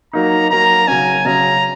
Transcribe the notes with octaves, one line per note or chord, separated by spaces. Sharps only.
F#3 A#3 D#4 A#5
F#3 A#3 D#4 A#5
C#3 F#3 C#4 G#5
C#3 F#3 C#4 A#5